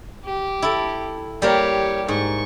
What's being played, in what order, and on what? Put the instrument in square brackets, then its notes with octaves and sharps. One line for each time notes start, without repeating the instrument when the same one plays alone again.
[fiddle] G4
[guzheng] E4 A4
[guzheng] G3 A#3 A#4 [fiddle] G4 C#5
[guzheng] G#2 [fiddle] C#6